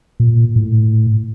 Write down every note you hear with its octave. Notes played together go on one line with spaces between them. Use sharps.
A#2
A2